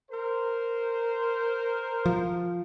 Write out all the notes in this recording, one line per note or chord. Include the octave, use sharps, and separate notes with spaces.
A#4 C5
F3